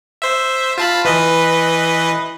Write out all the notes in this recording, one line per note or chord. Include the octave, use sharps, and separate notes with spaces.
C5 E5
F4 A5 B5
E3 B4 D#5